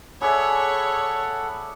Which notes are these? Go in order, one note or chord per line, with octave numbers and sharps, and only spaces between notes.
G#4 A4 C#5 D5 E5 F#5 B5